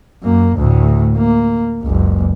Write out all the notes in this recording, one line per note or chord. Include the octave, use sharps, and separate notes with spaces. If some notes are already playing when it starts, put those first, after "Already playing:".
F#2 A#3
D2 A2
A#3
F#1 C#2